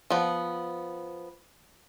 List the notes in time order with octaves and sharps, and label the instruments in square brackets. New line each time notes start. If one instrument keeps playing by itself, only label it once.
[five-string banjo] F3 B3